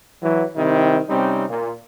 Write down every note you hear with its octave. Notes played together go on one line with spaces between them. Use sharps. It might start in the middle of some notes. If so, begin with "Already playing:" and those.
E3 F#3
C3 D#3 G3 C4 E4
C3 G3 C4 C#4 D#4
A#2